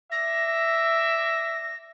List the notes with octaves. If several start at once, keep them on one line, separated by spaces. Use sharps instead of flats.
D5 E5 A#6